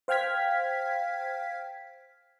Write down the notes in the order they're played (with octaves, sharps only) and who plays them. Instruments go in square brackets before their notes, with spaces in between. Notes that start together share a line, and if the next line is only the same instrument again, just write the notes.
[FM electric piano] C5 F5 G5 F6 G#6 B6